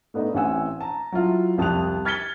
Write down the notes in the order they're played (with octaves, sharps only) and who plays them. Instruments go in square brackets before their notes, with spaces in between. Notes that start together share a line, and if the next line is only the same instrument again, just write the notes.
[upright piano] A3 B3 D4 D#4
A1 E3 C4 F#5 G#5 E6
A5 A#5
F#3 E4 F4
C2 F2 A5 D#6 F#6 F7
F6 G#6 A6 B6 C#7 G7